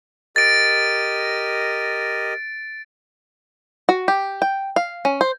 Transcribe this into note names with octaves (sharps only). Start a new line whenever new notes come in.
G4 A#4 D#5 A6 D7
F#4
G4
G5
F5
C#4
C5